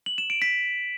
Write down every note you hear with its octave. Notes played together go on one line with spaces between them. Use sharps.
F#7
E7
D7
B6